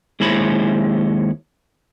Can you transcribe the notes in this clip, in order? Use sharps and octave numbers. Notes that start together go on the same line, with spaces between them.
D#2 G#3 E4 C5 C#5 B5